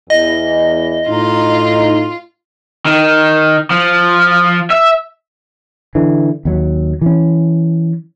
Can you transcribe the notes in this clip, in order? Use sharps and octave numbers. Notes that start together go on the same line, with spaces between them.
E2 D#5
A2 D#4 F4
D#3
F3
E5
D3 E3
D#2 F#3
E3 C#4